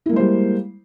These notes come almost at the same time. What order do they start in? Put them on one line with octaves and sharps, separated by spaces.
E4 A#3 G#3 C5 G3